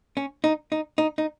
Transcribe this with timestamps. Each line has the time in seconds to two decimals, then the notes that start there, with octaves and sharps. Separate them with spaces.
0.17 C#4
0.44 D#4
0.72 D#4
0.98 D#4
1.18 D#4